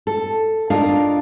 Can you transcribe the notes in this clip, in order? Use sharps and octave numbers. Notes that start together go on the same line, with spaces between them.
A4
D4 D#4 F4 A#4 F5